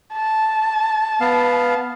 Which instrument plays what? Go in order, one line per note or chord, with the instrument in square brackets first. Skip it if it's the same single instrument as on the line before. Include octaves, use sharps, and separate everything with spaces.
[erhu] A5
[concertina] B3 F5